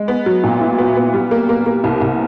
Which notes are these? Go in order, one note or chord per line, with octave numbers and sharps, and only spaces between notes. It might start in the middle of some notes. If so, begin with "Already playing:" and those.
Already playing: G#3
B3
F#3
A#2
E4
B3
B3
G3
A#3
A#3
A#3
C2
C2